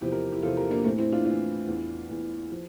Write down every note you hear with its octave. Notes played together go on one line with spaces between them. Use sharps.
E2 C3 F3 E4 G4
G4 A#4
E4 G4
E2 C3 F3 F4 A4
G4 A#4
A#3 D4
A2 E3 A3 C4
C4 E4
D4 F4
A2 E3 D4 F4
E2 E3
E2 E3
F3